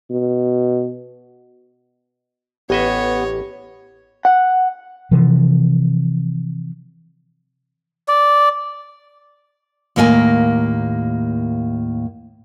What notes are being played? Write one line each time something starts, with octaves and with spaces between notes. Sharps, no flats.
B2
A1 B3 G4 C#5 D#5 E5
F#5
C3 E3 F3
D5
D#2 A2 A#3 G5 G#5